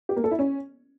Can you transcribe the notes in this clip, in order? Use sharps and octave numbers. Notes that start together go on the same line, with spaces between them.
G4
A#3
A4
E4
C#4